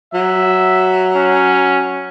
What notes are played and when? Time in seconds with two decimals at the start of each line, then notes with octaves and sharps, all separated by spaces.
0.14 F#3 E5
1.16 C#4